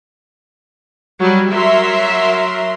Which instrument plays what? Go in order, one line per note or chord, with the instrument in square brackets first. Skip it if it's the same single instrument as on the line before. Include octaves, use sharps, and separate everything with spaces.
[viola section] F#3 G3
[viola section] F#3 A#4 C6 [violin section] E5